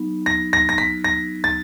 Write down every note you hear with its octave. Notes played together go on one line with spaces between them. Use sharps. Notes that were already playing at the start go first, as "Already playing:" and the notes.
Already playing: F#3 B3 D#4
A#6
A#6
A#6
B6
A#6
A6